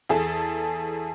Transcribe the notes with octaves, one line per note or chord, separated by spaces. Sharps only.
E2 G#4 A4 A5